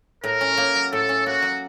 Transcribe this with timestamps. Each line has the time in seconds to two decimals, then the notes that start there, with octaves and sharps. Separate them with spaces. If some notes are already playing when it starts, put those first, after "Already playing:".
0.24 A2 A#4
0.41 C#4
0.57 A#3
0.75 F#3
0.93 A2 A4
1.09 C#4
1.26 A#3 F#4
1.42 F#3